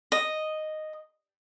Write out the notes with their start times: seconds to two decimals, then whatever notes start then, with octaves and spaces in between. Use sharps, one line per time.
0.12 D#5